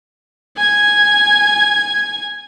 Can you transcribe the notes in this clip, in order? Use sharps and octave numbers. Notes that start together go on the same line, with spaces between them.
G#5 G#6